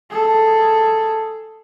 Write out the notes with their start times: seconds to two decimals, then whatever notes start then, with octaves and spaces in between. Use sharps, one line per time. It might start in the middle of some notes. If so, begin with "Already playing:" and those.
0.10 G#4 A4